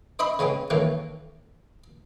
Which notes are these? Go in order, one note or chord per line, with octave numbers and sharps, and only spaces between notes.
C5 D#5 E5 B5 C6
C#3 G#3 B3 C4
D#3 E3 F#3 A3 A#3